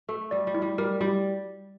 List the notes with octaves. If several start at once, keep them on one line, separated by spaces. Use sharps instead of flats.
A3 A4
G3 D5
G3
E4
G3
G3 A#4
G3 E4